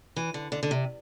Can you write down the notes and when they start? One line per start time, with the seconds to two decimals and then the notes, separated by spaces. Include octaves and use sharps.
0.16 E3
0.34 D3
0.52 D3
0.63 D3
0.71 C3